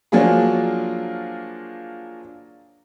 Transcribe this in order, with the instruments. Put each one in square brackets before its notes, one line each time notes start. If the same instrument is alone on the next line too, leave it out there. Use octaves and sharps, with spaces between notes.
[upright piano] F3 F#3 A#3 D4 F4 G#4